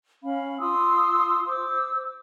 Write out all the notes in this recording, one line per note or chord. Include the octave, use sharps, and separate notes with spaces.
C#4 F5 B5
F4 C6 D#6 E6
C5 D6 E6